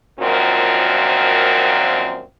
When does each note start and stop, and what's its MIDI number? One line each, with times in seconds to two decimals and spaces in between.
0.20 2.22 42
0.20 2.22 46
0.20 2.22 51
0.20 2.22 53
0.20 2.22 60
0.20 2.22 66